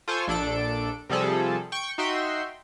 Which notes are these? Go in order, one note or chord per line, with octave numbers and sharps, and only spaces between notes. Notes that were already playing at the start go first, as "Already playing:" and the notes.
F4 A4 C5 G#5 C#6
A#1 D4 A4 D7
C3 F3 G3 G#4 A4
G5 C#6
D#4 F#4 E5 G5 C6